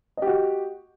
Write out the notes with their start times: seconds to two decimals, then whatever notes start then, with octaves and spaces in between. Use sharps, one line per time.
0.17 D#5
0.22 G4
0.27 F#4